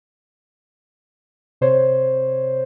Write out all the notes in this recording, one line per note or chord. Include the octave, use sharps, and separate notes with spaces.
C3 C5 C#5